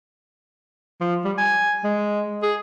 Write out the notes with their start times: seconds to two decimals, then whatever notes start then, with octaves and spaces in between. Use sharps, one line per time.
1.01 F3
1.25 G3
1.38 G#5
1.84 G#3
2.43 G#4